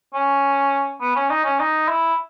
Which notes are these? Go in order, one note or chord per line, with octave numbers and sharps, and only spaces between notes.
C#4
B3
C#4
D#4
C#4
D#4
E4